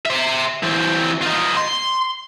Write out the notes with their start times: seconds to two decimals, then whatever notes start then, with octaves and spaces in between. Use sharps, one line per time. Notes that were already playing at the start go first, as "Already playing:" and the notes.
0.06 C5 E5
0.63 E3 C4
1.21 D#4 F4
1.57 C6